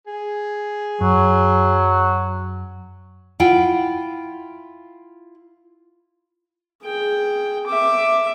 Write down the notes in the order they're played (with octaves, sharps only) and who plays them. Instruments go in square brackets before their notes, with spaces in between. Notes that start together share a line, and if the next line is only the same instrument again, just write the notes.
[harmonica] G#4
[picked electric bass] F#2 [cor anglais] F#3
[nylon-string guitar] E4 F4 F#5 G5
[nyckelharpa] G#4 G5
E5 D6